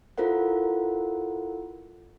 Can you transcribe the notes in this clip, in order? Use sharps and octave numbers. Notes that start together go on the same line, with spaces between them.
E4 F4 A4 A#4 C5 F#5